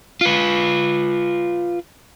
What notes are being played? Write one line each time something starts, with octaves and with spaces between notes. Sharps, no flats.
F4 B4